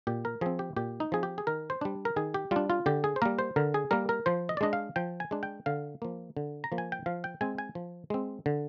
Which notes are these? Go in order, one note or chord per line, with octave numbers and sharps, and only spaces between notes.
A#2 G4
A#4
F3 C4 G#4
G4
A#2 G4
D#4
F3 C4 G#4
G4
G#4
D#3 A#4
C5
G3 D4
A#4
D#3 G#4
G4
G3 D4 F4
F4
D3 G4
G#4
C5
G3 A#3 A#4
C5
D3 A#4
G#4
G3 A#3 A#4
A#4
F3 C5
D#5
D5
G#3 D4 D#5
F5
F3 G5
G#5
G#3 D4
G5
D3 F5
F3 A#3
D3
A#5
F3 A#3
G#5
G5
F3 F5
G5
G#3 C4 G#5
G#5
F3
G#3 C4
D3